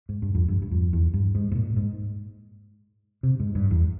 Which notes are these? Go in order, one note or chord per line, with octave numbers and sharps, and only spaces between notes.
G#2
G2
F2
G2
G2
F2
E2
G2
G#2
G#2
A#2
G#2
C3
G#2
G2
E2